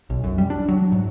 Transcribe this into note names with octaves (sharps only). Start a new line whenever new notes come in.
B1
F#2
G3
D4
F#3
G#2